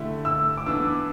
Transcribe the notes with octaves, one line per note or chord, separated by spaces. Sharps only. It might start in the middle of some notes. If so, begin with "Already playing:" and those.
Already playing: D3 A3 E4 G4
E6
D6
E3 B3 D4 E6